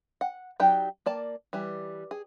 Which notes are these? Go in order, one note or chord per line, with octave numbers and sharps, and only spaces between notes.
F#5
F#3 D#4 G4 D5 G5
A#3 D5 A5
E3 G3
G#4